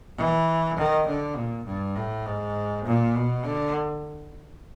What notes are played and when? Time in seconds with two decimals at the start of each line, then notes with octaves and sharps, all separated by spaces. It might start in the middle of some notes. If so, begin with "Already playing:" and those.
0.18 E3
0.77 D#3
1.07 D3
1.36 A#2
1.66 G2
1.96 A2
2.26 G#2
2.85 A#2
3.15 B2
3.44 D3